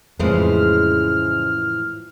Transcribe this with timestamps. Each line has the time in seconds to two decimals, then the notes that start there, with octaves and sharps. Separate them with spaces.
0.19 F2 A2 C#3 E3 F3 G#3 C5 F6